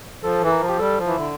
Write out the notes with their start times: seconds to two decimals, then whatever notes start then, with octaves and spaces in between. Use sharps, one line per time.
0.23 F3 A4
0.42 E3 A4
0.51 A#4
0.60 F3
0.68 G4
0.78 G3 A4
0.97 F3
1.07 E3 E4
1.16 D3